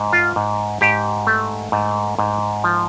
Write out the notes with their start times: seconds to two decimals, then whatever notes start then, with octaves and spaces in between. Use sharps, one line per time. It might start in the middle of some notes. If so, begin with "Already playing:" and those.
Already playing: G#2
0.13 F4
0.36 G#2
0.81 G#2 G4
1.27 A3
1.72 G#2
2.19 G#2
2.64 F3